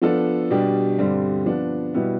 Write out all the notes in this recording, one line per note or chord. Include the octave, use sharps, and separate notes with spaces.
F3 B3 D4 A4
B2 G3 D4 G4
G2 D3 G3 C4
F3 B3 D4
B2 G3 B3 E4